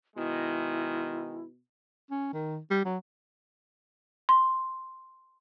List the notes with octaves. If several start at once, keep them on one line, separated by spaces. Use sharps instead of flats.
B2 D#3 G#3 E4
C#4
D#3
G3
F#3
C6